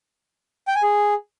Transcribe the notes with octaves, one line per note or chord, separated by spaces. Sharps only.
G5
G#5
G#4